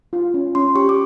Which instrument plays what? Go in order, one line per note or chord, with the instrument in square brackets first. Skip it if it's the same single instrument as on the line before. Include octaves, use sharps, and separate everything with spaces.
[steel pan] F4
C#4
[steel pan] C#4 [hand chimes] C6
[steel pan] G4 [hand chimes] C#6
[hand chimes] D6